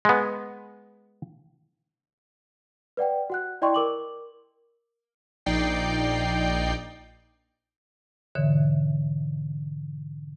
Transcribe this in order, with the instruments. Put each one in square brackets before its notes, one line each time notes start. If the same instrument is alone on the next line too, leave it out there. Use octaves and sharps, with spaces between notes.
[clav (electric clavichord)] G#3 B3
[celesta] B4 D5 F#5 G5
F#4 F#5 F#6
E4 D5 D#5 G5 C6 C#6
A#4 D6 F#7
[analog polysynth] A#1 D#4 D5 G5 C7
[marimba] G#2 B2 D3 E3 C#5 E5